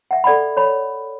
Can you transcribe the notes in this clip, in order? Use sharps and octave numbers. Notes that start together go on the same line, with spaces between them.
E5 F#5
A4 D5 F#5 B5
C#5 B5